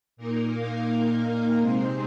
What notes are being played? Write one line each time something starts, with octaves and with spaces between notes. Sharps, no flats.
A#2 A#3 D#4 A#4
F5
C3 G#3 C4 D#4 C5